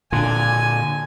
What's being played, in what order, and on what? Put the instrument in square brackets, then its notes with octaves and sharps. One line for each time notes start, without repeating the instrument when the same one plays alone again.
[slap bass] A#2 D3 [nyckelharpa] G#5